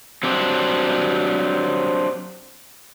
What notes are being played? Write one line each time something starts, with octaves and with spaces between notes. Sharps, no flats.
F#3 C4 D4 G4